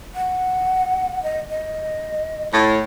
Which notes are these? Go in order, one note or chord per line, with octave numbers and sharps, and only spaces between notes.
F#5
D#5
D#5
A2